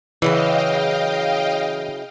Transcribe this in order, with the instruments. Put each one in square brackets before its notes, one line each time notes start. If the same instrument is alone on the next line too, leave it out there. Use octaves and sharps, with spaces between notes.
[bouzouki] C#3 F#3 E4 [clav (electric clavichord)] E3 [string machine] D#5 F5 G5